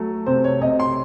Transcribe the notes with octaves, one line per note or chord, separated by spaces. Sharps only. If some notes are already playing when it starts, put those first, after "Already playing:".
Already playing: F#3 A3
C3 C5
C#5
C3 D#5
C6